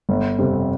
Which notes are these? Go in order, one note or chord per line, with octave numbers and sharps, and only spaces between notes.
G1
F2 C3 G3 C4